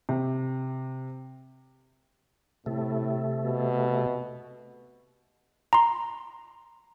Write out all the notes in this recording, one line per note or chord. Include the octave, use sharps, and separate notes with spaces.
C3
A2 C3 A3
B2
A#5 C6